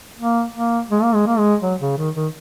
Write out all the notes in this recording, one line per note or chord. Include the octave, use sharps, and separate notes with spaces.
A#3
A#3
G#3
A#3
G#3
A#3
G#3
F#3
C#3
D#3
D#3